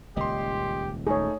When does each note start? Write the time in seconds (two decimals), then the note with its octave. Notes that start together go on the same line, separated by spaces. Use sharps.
0.17 D#1 C#2 G4 D#5 C6
1.07 A3 D#4 G#4 C#5